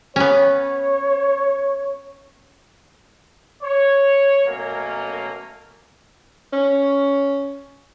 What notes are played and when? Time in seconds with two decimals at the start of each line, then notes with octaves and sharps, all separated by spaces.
0.16 B3 C#4 C#5
3.63 C#5
4.46 B2 F#3 A3 A#3 C#4 A#4
6.53 C#4